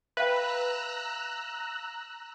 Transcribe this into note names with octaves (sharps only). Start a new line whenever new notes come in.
B4 E5 F5 G5 A#5 E6 F#6